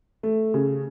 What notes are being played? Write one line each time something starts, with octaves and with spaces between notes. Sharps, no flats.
A3
C#3